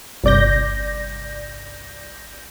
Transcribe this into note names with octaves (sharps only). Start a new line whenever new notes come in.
G1 C2 D5 G6 A#6